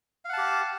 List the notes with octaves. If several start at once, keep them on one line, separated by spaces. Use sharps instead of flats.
G4 F5 F#5 A5